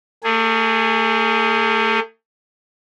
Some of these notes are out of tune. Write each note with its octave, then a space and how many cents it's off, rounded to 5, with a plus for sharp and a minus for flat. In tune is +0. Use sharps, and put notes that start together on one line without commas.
A3 +40 G#4 +0